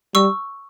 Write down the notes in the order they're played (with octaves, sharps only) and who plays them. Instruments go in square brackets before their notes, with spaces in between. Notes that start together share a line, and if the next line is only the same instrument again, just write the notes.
[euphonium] G3 [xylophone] C#6 E6